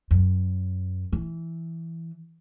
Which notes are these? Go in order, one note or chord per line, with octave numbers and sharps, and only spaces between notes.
F#2
E3